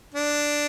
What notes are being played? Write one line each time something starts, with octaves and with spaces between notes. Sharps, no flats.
D4